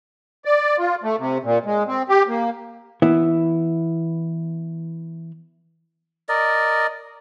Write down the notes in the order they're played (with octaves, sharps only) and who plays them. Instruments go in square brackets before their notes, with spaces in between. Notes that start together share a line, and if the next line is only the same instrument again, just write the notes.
[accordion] D5
F4
A3
C3
A#2
G#3
C4
G4
A#3
[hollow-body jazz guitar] E3 B3 E4
[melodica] A#4 D5 D#5